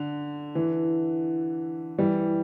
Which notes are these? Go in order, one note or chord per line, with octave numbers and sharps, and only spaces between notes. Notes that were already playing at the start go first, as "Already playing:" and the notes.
Already playing: D3
E3
E3 G3